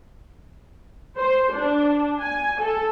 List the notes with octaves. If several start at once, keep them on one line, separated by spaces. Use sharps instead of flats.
C5
D4
G#5
A4